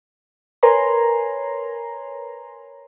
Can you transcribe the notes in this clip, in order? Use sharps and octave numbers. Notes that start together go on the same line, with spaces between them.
A#4 B4 C#5 G#5 A#5 C6